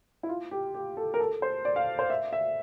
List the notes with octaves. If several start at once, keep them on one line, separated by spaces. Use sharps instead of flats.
E4
F4
G4
G4
A4
A#4
A4
C5
D5
F5
C5
E5
E5